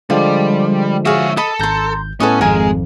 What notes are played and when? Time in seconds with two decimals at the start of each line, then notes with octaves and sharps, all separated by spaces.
0.10 D3 F3 G3 G#3 F4
1.05 F#4 G#4 C#5 E5 F5
1.37 A4 D#5 B5
1.59 G#1 A#5 C6 G6
2.20 A2 B3 C#4 A4 B4 D#5
2.41 G#1 F2 G#3 A#4 F5 G#5